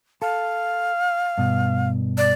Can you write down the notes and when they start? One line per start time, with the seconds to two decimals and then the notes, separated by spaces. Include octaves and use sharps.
0.22 A4 F5
1.38 G2 B2
2.18 D5